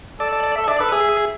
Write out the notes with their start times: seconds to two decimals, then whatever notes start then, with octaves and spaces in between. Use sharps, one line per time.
0.20 A4 D5
0.32 D5
0.44 D5
0.56 A4 E5
0.68 D4 D5
0.80 A4 B4
0.92 G#4 E5